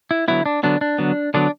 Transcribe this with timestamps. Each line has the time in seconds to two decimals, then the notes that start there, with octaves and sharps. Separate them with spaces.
0.11 E4
0.28 D3 F#3 B3 E4
0.46 D4
0.63 D3 F#3 B3 D4
0.81 D4
0.98 D3 F#3 B3
1.34 D3 F#3 B3 D4